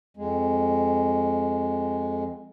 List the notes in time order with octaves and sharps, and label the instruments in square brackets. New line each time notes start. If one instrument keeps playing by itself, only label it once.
[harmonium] F2 G#3